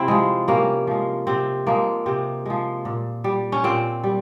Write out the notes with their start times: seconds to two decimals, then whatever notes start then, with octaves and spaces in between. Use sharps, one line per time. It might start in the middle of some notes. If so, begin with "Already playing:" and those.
Already playing: C3 C4 E4
0.08 F3 G#3
0.48 C3 A#3 C#4
0.87 F3 G#3
1.27 C3 C4
1.66 F3 G#3 A#3
2.06 C3 C4
2.46 F3 G#3
2.85 A#2
3.24 G3
3.52 C#4
3.64 A#2 C4
4.04 G3